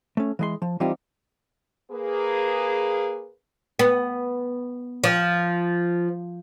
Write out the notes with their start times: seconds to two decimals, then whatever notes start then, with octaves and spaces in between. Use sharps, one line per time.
0.17 A3 C#4
0.39 E3 G#3 C6
0.62 F3
0.80 E3 G3 C4 D#4 F4 G4
1.91 A#3 G#4 B4
3.79 B3
5.04 F3